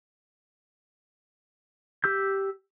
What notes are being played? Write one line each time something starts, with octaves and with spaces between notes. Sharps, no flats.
G4 E6 G6